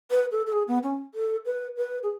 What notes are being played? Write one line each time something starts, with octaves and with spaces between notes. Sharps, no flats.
B4
A4
A4
G#4
B3
C#4
A4
B4
B4
G#4